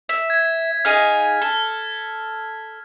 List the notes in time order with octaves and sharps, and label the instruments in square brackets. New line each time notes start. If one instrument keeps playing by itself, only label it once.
[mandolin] E5
[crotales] G#6 B6
[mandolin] D#4 G#4 F5 [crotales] F6
[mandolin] A4